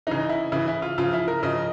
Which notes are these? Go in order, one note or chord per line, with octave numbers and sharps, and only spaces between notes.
C#3 E3 D#4
E4
C#3 E3 E4
E4
F4
C#3 F3 F4
E4
A#4
C#3 F3 D#5